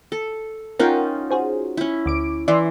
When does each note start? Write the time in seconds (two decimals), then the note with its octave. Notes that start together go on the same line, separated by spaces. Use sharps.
0.12 A4
0.80 C#4 D#4 F4 A#4 F#5 G5
1.31 F#4 G#4 C5
1.77 C#4 E4
2.06 D2 D6 D7
2.48 E3 D5 E5 C6